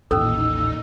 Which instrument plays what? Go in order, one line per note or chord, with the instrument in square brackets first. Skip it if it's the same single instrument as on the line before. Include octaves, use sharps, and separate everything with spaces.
[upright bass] A1 D#2 [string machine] A#2 D#4 [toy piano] C#4 A4 [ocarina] E6